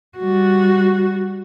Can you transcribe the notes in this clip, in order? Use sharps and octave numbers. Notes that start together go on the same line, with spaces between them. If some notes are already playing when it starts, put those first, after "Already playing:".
G3 F#4